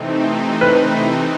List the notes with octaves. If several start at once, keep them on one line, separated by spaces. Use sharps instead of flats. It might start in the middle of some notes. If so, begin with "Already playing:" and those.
Already playing: C3 E3 A3 C4 D#4
B4